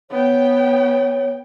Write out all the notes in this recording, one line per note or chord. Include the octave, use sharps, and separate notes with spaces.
B3 C#5 G5